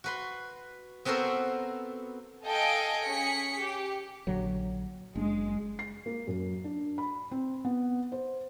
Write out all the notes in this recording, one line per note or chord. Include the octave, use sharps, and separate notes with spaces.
F#4 B4 C6
B3 C4 F#4 A4 A#4 C5
A4 D#5 F5 G5 G#5
C#4 G#4 B6 C#7
G4
A#1 D3 F#3
F#1 G#3 D4
C7
A#3
F#2
D4
B5
C4
B3
C5